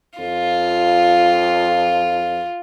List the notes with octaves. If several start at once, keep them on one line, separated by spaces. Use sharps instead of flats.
F2 F4